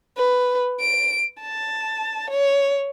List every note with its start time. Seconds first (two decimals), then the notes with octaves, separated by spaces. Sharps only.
0.18 B4
0.80 D7
1.42 A5
2.30 C#5